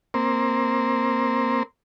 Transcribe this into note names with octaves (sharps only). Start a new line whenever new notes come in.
A#3 C4